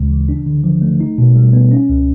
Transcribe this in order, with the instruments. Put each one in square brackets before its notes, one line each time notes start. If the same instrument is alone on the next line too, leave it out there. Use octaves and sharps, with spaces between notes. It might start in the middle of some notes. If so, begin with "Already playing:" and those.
Already playing: [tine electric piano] D2 C#3 G#3
E3
D4
D3
F3
A3
D#4
B2
G3
B3
C#4
C#2